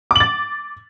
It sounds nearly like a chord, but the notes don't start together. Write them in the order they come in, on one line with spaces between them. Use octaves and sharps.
D6 F#7 A6